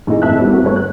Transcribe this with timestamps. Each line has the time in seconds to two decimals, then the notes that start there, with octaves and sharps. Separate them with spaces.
0.07 A1 A#2 D#4 G#4
0.22 G#1 F2 A3 E5 A5 F#6
0.37 G3 A3 B3 C#4 E4
0.51 A#3 C4 F#4
0.64 G1 A3 A4 B4 C#5
0.76 F#6